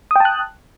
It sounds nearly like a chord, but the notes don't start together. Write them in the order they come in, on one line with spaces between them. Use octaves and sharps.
D#6 G5 A5 F#6